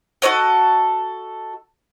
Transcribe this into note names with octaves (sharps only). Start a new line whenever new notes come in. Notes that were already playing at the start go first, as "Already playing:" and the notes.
F#4 A4 C#5 D#5